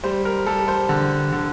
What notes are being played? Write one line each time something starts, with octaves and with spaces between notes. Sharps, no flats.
G3 C5
A#4
G3 A4
C5
D3
D3